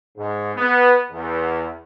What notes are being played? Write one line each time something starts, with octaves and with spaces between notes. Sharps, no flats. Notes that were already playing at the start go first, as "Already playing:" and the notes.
G#2
B3
E2